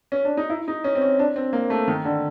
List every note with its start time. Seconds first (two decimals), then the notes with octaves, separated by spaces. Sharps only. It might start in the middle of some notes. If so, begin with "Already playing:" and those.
0.12 C#4
0.25 D4
0.37 D#4
0.50 E4
0.68 D#4
0.84 C#4
0.95 C4
1.02 C#4
1.19 D4
1.36 C4
1.53 A#3
1.70 A3
1.88 D#3
2.05 D3